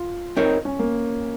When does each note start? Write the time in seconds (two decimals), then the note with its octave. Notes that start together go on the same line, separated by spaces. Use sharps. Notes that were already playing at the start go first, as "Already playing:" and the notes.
Already playing: F4
0.37 C4 D#4 A#4 C#5
0.65 C#4
0.79 A#3